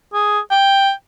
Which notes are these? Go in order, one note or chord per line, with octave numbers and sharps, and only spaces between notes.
G#4
G5